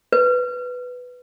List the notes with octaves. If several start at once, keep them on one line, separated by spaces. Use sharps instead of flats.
B4